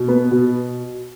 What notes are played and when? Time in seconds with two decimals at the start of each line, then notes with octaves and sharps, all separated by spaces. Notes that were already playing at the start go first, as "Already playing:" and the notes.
Already playing: B2
0.08 B3
0.31 B2